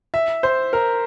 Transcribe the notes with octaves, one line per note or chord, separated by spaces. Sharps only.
E5
C5
A#4